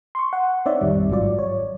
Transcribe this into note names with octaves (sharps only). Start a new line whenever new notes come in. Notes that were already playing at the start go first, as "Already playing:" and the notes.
C6 C#6
F#5
C4 D#4 C#5 D5 E5
A1 F2 D#3 G3
G1 G#2 F#3 F4 D5
C#5